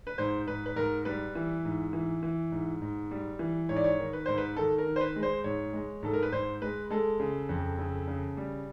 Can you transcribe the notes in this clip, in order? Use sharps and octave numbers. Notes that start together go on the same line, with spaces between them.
B4
G#2 C5
G#2 B4
B4
G#2 A#4
G3 B4
E3
G#2
E3
E3
G#2
G#2
G3
E3
G#2 C#5
D5
C#5
D#3
B4
G#2 C5
B4
D#3 A4
A#4
D#3
C5
B4
G#3
C5
G#2 C#5
G#3
G#2 A4
A#4
B4
G#2 C5
G#3 B4
G#3 A4
C#3
F2
C#3
C#3
G3